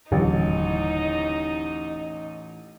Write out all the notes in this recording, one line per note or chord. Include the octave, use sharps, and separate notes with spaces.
D#1 A1 D3 F#3 D#4